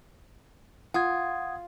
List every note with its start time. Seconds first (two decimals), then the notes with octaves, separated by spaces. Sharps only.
0.94 F4 F#5 D#6 G#6